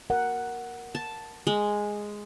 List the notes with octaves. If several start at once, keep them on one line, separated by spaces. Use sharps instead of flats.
A#4 F#5
A5
G#3